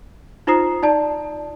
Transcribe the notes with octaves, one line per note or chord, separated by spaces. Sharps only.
D#4 F4 C5 A#5 D#6 C7
D#4 D5 A5